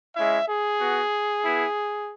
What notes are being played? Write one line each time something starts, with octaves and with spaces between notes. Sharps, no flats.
G#3 C#4 E4 E5
G#4
B3 F#4
B3 E4